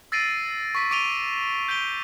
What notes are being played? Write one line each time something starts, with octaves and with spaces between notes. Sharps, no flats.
E6 A6 A#6 C7 D7 D#7
C#6 D6 B6
C#6 D6 D7 D#7 F7 G7
G6 B6 D7 F7 G7